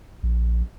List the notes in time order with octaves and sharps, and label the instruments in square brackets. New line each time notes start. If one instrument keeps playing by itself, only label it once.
[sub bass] A#1